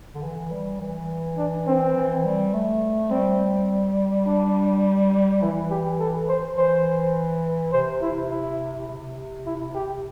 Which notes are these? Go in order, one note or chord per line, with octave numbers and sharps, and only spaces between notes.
D3
E3
G3
E3
D4
C4
E3
G3
A3
G3 C4
D4
E3 E4
G4
A4
C5
E3 C5
C3 C5
E4
E4
C3
E4
G4